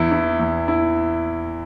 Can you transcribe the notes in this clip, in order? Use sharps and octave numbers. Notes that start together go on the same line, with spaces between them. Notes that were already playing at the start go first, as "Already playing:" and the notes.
Already playing: E2 E4
E4
E2
E4